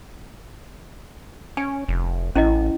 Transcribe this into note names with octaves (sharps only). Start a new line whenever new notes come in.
C#4 G#5
F1
A1 C#4 E4 D#5